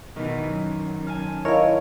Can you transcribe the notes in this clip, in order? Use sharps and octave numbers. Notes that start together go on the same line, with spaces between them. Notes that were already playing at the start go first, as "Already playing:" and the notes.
B2 D#3 E3
F#2
G#5 A5 F6
E4 A#4 C#5 D#5 F5